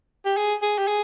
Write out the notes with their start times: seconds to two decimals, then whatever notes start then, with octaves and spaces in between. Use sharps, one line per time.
0.25 G4
0.37 G#4
0.62 G#4
0.78 G4
0.87 G#4